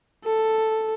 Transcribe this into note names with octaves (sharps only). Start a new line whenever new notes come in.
A4